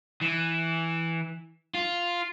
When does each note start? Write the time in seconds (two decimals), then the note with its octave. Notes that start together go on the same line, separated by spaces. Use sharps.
0.21 E3
1.74 F4